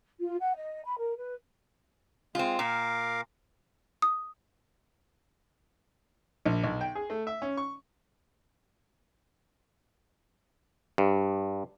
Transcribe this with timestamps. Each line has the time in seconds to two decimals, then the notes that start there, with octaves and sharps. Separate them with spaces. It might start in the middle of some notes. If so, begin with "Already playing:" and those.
0.19 F4
0.39 F#5
0.55 D#5
0.84 B5
0.98 A#4
1.17 B4
2.35 G#3 C4 F4
2.59 A#2 A#4 F5 D6
4.02 D#6
6.46 A#1
6.63 B1
6.81 G5
6.95 G#4
7.10 A3
7.27 E5
7.42 C#4
7.57 C#6
10.98 G2